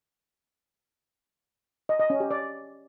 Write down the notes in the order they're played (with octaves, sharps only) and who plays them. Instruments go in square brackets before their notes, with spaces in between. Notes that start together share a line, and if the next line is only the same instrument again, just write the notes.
[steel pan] D#5
D#5
C#4
G4
D5